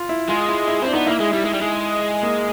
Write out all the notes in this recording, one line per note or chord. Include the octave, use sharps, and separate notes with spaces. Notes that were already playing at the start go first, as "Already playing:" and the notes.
Already playing: F4
E4
G#3 F4
E4
E4
C4 E4
D4
B3 D#4
A#3 E4
G#3 E4
G3 E4
G#3
G3
G#3
A#3